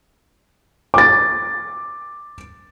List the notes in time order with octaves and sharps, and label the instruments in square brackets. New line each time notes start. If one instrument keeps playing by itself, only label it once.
[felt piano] D6 A6